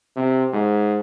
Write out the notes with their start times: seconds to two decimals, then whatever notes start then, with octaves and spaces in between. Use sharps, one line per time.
0.16 C3
0.53 G#2